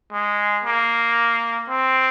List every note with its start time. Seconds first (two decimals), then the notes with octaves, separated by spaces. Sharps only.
0.12 G#3
0.64 A#3
1.70 C4